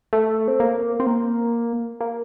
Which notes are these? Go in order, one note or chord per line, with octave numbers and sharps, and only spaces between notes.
A3
C4
A#3
C4
A#3
A#3